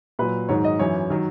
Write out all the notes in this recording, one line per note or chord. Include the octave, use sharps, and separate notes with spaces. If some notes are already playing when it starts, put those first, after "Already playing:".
A#2 F#3 B4
G#2 D#3 F#3 C#5
D#5
F#2 E3 C#5
D#3 F#3